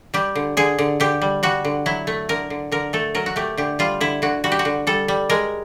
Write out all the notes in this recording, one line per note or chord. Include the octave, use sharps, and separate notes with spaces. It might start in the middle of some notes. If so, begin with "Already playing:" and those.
G3 G4
D3
D3 G#4
D3
D3 G4
G3
G3 F#4
D3
F#3 E4
A3
D3 A#4
D3
D3 A#4
A3 A4
F#3 A#4
F#4
A3 G4
D3 G4
G3 F4
D3 E4
D3 F#4
G3 F#4
G4
F#4
D3
G3 A4
G3
G#3 A#4